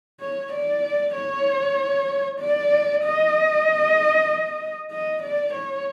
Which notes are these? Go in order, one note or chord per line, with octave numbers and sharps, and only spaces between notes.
C#5
D5
C#5
D5
D#5
D#5
D5
C#5